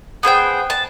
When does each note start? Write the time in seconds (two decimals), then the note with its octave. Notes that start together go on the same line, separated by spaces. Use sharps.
0.23 B3 G#4 C5 G5
0.70 A5